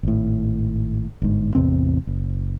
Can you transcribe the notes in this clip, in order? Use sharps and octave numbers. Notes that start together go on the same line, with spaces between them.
G#1 A2
G1 G#2
A1 E2 C3 C4
F#1